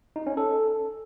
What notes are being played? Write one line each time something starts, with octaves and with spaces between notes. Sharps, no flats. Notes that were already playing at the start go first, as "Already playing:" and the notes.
D#4
C#4
A4